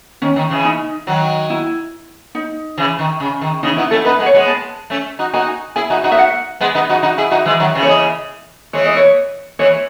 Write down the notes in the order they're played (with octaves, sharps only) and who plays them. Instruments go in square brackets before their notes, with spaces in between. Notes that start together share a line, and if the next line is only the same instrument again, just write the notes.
[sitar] D#3 [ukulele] C#4
[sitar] D#3
C#3 E3
[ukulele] D#4
[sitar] D#3 F#3
[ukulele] E4
D#4
[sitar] C#3 E3
D#3
C#3
D#3
[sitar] C#3 E3 [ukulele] D#4
[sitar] B3 D#4 [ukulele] E4
[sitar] A3 C#4 [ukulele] A4
[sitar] B3 D#4 [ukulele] B4
[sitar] G#3 B3
[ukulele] C#5
[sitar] G#3 B3
[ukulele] A5
[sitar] A3 C#4
D#4 F#4
[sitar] D#4 F#4 [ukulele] G#5
[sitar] E4 G#4 [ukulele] G#5
[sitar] D#4 F#4
D#4 F#4
[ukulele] E5
F#5
[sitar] G#3 B3
B3 D#4
D#4 F#4
D#4 F#4
E4 G#4
D#4 F#4
E3 G#3
D#3 F#3
C#3 E3
[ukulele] C#5
D#5
[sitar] E3 G#3 [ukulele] C#5
[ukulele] D#5
C#5
[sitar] E3 G#3 [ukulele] C#5